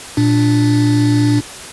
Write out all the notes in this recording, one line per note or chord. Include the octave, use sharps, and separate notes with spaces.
A#2 D4